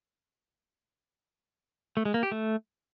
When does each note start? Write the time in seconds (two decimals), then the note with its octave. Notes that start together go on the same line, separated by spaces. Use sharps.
1.97 A3
2.05 G#3
2.14 A#3
2.23 G4
2.32 A3